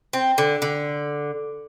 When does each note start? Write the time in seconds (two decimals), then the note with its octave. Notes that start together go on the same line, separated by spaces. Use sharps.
0.13 C4
0.38 D3
0.62 D3